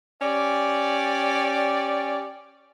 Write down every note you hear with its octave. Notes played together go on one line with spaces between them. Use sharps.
C#4 G4 D5